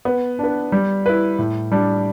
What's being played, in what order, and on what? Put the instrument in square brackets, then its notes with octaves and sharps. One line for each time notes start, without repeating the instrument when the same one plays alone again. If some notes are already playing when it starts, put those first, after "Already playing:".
[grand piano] B3
D4 B4
G3
E4 B4
A2
G3 D4